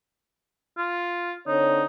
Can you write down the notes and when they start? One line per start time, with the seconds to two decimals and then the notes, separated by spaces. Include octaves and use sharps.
0.77 F4
1.47 D3 C4 D#4 C#5